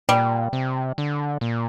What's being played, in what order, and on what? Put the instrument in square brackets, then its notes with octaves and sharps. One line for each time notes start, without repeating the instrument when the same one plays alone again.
[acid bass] A#2 [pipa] G3
[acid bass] C3
D3
A#2